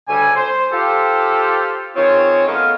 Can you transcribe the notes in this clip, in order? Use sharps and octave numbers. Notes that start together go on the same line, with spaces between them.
D2 C#3 G3 A4 G#5
C5
F4 G4 A4 C5
D#3 C4 F4 G#4 C#5
A3 B3 C#4 A#4 D#5 F5